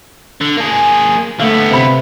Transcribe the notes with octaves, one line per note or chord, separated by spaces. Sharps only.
D3
A#3 G#4
D3 A3 B3 F5
C3 B5